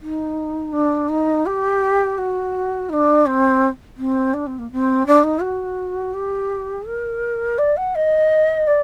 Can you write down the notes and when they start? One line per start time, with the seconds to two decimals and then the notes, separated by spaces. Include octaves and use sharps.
0.01 D#4
0.72 D4
1.08 D#4
1.45 G4
2.18 F#4
2.89 D#4
2.93 D4
3.26 C4
3.97 C4
4.33 D4
4.46 C4
4.58 A#3
4.72 C4
5.06 D4
5.23 D#4
5.41 F#4
6.13 G4
6.86 A#4
7.58 D5
7.76 F#5
7.95 D#5
8.67 D5